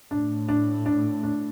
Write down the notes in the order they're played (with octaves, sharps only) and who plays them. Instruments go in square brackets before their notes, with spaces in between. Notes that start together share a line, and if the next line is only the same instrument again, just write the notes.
[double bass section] A2 [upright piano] D4
[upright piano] D4
D4
D4